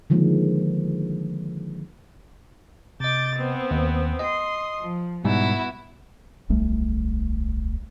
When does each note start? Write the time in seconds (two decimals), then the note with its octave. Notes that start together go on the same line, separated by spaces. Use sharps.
0.10 D3 D#3 F3 G#3 A#3
3.00 C3 D#5 D6 G6 A6
3.36 B3 C4
3.71 D#2
4.19 D#5 C6 D#6
4.79 F3
5.25 G#2 B2 G3 B3 E4 F#4
6.49 D1 B1 G3 A3